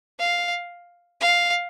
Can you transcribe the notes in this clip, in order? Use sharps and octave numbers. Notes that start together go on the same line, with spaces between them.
F5
F5